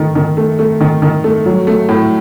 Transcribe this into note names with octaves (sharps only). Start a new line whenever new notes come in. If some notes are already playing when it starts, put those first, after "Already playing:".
Already playing: D#3 A3
D#3
A3
A3
D#3
D#3
A3
F#3
A3
A2